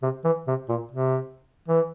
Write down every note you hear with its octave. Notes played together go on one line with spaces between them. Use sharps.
C3
E3
C3
A#2
C3
E3